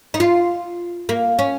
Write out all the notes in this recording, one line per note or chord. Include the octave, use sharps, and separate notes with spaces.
D#4
F4
A#3
C#4